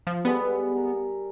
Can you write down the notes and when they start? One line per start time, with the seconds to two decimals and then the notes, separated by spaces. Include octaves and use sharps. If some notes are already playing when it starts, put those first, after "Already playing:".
0.07 F3
0.25 G3 G#3 B3 A4
0.77 A#4